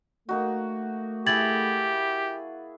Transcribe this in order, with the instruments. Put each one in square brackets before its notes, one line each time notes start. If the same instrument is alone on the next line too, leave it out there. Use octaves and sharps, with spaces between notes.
[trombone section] A3 [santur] A#3 D#4 F#4
[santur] E4 G#4 [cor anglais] G4 [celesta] G#6 A6 F#7